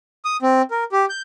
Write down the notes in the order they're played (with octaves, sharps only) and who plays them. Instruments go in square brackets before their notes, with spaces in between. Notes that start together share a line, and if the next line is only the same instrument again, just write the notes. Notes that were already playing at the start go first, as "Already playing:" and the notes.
[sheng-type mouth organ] D#6
C4
A#4
G4
G6